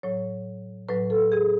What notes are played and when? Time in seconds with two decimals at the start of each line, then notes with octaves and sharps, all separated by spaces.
0.03 A2 F#3 C#5
0.89 A2 F#3 B4
1.10 A4
1.32 G#4